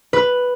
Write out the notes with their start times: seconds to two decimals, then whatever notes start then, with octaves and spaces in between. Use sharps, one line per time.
0.13 B4